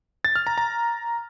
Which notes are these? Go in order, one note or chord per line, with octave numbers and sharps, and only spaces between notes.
A6
F6
A#5
A#5